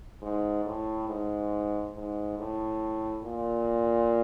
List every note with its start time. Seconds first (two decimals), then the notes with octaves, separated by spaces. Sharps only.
0.22 G#2
0.65 A2
1.08 G#2
1.95 G#2
2.38 A2
3.24 A#2